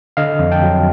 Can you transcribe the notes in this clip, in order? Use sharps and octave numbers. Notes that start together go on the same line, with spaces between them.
D3 D#5 F5
F2
G5 A5
F#3